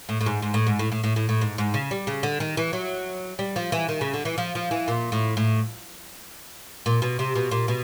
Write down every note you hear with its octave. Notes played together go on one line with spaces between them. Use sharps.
A2
A2
G#2
G#2
A2
G#2
A2
A2
A2
A2
A2
G#2
G#2
C#3
G3
C#3
D3
D#3
E3
F#3
G3
F3
E3
D#3
C#3
D3
E3
F3
F3
E3
A#2
A2
A2
A#2
B2
C3
B2
A#2
B2